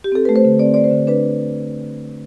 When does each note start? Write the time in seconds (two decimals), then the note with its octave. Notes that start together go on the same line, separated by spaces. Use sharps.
0.04 G4
0.12 C4 A4
0.25 A3 B4
0.36 C5
0.45 D3
0.59 C4 D5
0.74 A3 D5
0.84 C5
0.91 D3
1.07 D4 B4